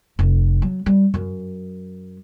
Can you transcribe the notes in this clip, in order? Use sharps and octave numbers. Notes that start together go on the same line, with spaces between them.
F1
F#3
G3
F#2